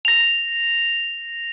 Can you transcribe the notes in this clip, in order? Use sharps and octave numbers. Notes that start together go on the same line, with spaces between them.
A#6 F7